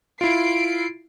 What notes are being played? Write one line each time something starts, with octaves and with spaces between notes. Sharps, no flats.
E4 F4 C7 D7